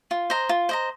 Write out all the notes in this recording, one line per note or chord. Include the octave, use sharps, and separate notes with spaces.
F4
C5 D#5 A#5
F4
C5 D#5 A#5